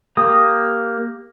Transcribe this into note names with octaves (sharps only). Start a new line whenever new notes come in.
A#3 G4 D#6